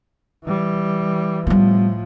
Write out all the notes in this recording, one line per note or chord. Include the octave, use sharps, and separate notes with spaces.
E3 G3
A2 F3 G3 B3